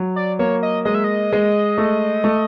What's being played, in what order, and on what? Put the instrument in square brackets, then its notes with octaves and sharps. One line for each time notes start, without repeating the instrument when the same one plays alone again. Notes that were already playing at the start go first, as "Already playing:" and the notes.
Already playing: [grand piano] F#3
[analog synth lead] D5
[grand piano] A#3 [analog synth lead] C#5
[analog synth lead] D#5
[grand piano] G#3 [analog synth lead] D#5
[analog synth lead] E5
D#5
[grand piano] G#3
A3
A3